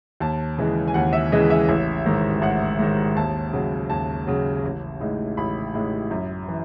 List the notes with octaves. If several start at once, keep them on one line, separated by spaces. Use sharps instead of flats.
D#2 A5
C#3 E3 G#3
G#5
D#2 F#5
E5
C#3 E3 G#3 D#5
E5
A1
G#2 D#3
A1 F#5
G#2 D#3
D#2 A5
C#3 F#3
D#2 A5
C#3 F#3
A1
A2 G#3 D#4
A1 B5
A2 G#3 D#4
F#2
E3